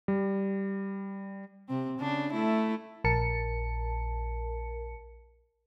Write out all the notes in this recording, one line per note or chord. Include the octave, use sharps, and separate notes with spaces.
G3
C3 C4
C#3 D4
A3 E4
A#1 A#4 A5 C#7